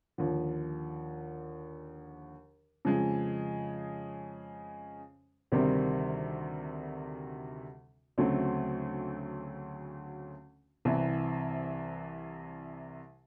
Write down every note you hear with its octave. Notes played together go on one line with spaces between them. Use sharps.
D#2 D3 F3
F2 C#3 F3 G#3
D2 C3 D#3 G3 C4
D2 C#3 F#3 A3 C4
C2 C3 E3